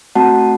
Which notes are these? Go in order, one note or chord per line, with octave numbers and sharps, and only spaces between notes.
A3 C4 F#4 F#5 A5